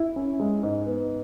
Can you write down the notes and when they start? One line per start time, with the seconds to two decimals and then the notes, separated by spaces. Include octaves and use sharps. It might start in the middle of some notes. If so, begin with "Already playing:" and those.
Already playing: E4
0.16 C#4
0.40 G#3
0.63 G#2
0.86 B3